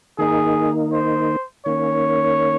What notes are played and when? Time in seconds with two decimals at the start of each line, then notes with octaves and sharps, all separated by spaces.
0.18 D#3 A#3 D#4 G#4
0.92 C5
1.66 D#3 A#3 C#4 C#5